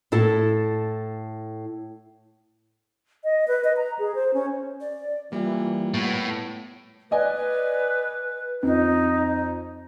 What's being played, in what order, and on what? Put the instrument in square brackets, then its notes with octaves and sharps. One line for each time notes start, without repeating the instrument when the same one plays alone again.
[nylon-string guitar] A2 E4 A4
[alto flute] D#5
B4
D#5
A#5
G#4
C5
C#4
[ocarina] D5
[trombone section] E3 [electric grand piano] G3 A#3 [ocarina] F4
[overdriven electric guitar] A2 [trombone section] B3
[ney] B4 [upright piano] D5 D#5 G#5
[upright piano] F2 [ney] D#4